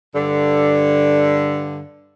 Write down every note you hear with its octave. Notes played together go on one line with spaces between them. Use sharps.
G2 D3